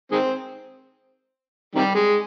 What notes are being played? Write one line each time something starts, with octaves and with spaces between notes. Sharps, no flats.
D#3 G#3 C4
C3 D#3 G3
G#3